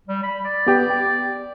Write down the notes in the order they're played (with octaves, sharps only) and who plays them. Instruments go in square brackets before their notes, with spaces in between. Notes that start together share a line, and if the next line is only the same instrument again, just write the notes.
[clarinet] G3
B5
D5
[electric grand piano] B3 G4 G5
G5